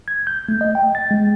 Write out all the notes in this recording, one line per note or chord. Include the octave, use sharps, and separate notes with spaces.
G#6
G6
A3
D#5
G5
A6
G#3